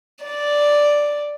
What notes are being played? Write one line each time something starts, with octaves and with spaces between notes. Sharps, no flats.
D5